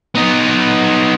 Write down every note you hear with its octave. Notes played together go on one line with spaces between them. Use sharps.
B3 D#4